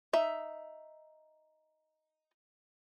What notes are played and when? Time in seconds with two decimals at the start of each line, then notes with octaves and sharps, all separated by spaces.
0.13 D#4 E5